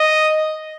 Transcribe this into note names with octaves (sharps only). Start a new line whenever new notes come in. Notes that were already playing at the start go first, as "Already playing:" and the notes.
Already playing: D#5